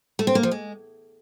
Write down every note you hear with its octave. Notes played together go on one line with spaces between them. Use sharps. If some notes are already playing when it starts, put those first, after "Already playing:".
A3
C4
A#3
F3
G#3